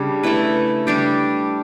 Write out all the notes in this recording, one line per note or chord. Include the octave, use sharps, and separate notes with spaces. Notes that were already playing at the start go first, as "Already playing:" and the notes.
Already playing: C#3 G3 D4
A3 E4 B4
G3 D4 G4